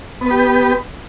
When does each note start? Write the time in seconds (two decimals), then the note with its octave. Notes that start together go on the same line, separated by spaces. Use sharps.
0.21 B3
0.26 B4
0.31 G4